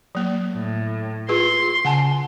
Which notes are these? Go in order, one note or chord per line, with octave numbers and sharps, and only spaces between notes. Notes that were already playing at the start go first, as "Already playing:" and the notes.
F#3 A#3
A2
F4 G#4 B4 C6
C#3 F#5 G#5 A5